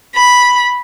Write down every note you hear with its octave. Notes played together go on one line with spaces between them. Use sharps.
B5